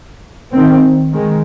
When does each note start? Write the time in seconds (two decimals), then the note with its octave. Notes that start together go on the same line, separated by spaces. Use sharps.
0.52 D#3 C4
1.13 D#3 G#3